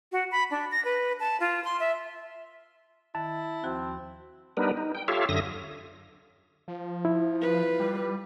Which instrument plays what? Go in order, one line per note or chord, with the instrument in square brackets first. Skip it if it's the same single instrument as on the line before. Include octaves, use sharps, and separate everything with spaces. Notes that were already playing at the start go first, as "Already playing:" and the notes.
[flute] F#4
B5
D4
A#6
B4
A5
F4
C6
E5
[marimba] D#3 [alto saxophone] E4 [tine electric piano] A5
[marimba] D#2 F3 F#4 [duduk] C4
[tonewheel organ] G3 B3 D4 D#4 A#4 B4
D#4
G5
F4 G4 A4 C#5 E5 F5
F#2 D3 E5 D#6 A#6
[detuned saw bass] F3
[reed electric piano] E4
[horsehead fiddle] F4 B4
[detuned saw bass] G3